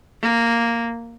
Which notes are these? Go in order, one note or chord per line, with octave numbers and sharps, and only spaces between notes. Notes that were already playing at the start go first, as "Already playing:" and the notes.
A#3